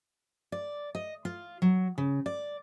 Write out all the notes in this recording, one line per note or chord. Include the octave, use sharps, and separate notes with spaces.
D5
D#5
F4
F#3
C#3
D5